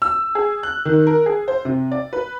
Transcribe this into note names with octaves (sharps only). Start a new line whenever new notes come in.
E6
G#4
F#6
D#3
A#4
G#4
C5
C3
D5
B4